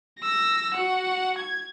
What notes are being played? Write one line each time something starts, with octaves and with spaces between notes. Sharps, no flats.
E6 A#6
F#4 F#5
G#6